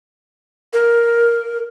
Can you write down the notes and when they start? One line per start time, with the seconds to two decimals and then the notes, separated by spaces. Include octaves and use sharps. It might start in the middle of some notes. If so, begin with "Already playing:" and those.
0.73 A#4